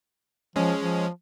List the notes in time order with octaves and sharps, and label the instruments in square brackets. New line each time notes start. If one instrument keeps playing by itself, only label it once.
[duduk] F3 [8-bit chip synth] G#3 C#4
[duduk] F3